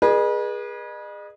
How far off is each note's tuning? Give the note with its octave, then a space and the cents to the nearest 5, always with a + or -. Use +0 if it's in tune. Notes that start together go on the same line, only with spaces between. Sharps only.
G#4 -5 B4 -35 D#5 -45